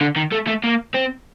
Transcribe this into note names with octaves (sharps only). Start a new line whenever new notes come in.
D3
D#3
A3
A3
A#3
C4